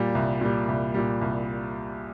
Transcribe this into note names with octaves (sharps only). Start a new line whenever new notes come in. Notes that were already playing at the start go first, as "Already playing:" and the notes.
Already playing: A#2 G3
C2
A#2 G3
C2
A#2 G3
C2